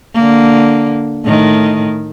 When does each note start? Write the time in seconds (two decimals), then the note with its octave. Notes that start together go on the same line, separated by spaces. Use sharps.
0.15 D3 A#3
1.25 A2 D#3